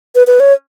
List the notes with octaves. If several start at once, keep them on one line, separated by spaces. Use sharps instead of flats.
B4
B4
C#5